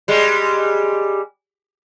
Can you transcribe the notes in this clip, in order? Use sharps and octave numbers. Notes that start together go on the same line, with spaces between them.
G3 G#3